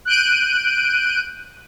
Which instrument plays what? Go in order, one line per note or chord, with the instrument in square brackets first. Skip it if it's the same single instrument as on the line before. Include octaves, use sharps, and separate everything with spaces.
[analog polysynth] F#6 G6 D7 D#7